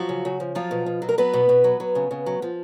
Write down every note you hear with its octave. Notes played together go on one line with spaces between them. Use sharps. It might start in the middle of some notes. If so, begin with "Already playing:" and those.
Already playing: F3 F#3 F#4
C#3
C#3
F3
F3 F#3 F4
B2
B2
F#3
A#4
F#3 B3 B4
B2
B2
F#3
F#3
C#3
C#3
F#3
F3